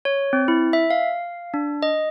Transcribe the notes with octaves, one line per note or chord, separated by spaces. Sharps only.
C#5
C4
E4
E5
F5
D4
D#5